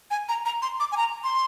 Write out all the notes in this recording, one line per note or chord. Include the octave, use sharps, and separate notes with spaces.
G#5
A#5
A#5
C6
D6
G#5
A#5
C6